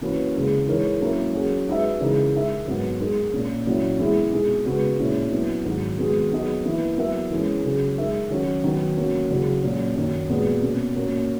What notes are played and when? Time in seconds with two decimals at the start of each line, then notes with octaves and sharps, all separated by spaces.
0.01 E3 A#3 C#4 F#4 B4
0.34 E2 C#3 G#3
0.67 E3 G#3 D#4 A#4 C#5
1.01 F#3 A#3 C#4 E4 A#4
1.34 F#3 C#4 G#4
1.68 G#3 D#4 F#4 B4 E5
2.00 C#3 E3 G#3 D#4 A#4
2.33 G#3 D#4 A#4 E5
2.67 G#2 F#3 B3
3.00 G#3 D#4 A#4
3.32 A#2 A#3 C#4
3.67 A#2 F#3 C#4 E4
3.99 E3 G#3 B3 E4 G#4
4.33 B2 G#3 D#4 G#4
4.65 C#3 G#3 B3 F#4 B4
4.99 A#2 G#3 C#4 E4
5.31 F#3 B3 E4
5.65 G#2 D#3 F#3
5.98 D#3 G#3 B3 F#4
6.31 F#3 B3 D#4 G#4 D#5
6.65 E3 A#3 E4 B4
6.98 F#3 B3 E4 A#4 E5
7.31 E3 G#3 C#4 G#4
7.65 C#3 F#3 C#4 G#4
7.98 G#3 D#4 A#4 E5
8.30 D#3 F#3 C#4 F#4
8.64 D#3 F#3 B3
8.97 F#3 A#3 C#4 F#4
9.30 E2 C#3 F#3
9.63 A#2 F#3 C#4
9.96 F#2 D#3 F#3
10.29 A#2 G#3 B3 F#4
10.63 B2 A#3 C#4
10.96 A#2 A#3 C#4 F#4 A#4